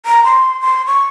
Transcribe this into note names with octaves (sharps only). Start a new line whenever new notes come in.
A#5
C6
C6
C#6